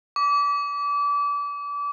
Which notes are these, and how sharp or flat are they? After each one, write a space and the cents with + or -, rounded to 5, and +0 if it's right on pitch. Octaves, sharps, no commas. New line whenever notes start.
D6 -30